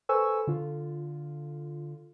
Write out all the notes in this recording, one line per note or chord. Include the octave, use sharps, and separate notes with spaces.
A4 B4 C5 G#5 C#6 E6
D3 F4